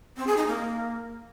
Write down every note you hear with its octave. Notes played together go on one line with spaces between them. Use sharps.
C4
G#4
D#4
A#3